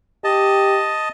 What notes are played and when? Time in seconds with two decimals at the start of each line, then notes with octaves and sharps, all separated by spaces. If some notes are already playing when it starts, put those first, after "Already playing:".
0.24 G4 D#5 A5